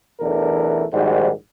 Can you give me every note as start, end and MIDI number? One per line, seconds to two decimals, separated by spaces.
0.20 0.84 35
0.20 0.84 40
0.20 0.84 52
0.20 0.84 57
0.20 0.84 62
0.20 0.84 70
0.92 1.30 34
0.92 1.30 44
0.92 1.30 51
0.92 1.30 55
0.92 1.30 66
0.92 1.30 72